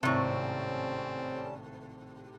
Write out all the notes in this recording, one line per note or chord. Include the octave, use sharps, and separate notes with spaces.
G#1 A2 C3 G3 C4 C#4 A5 C#6